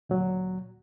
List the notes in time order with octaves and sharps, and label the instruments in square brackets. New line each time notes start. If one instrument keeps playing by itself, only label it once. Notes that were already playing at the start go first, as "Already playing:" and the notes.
[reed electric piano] D2 A#2 F#3